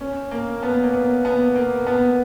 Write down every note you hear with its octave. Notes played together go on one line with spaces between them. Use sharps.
C#4
A#3
B3
A#3
B3
B3
A#3
B3